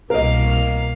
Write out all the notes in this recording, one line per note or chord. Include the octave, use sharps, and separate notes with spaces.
C2 B2 A#3 A#4 D#5 F5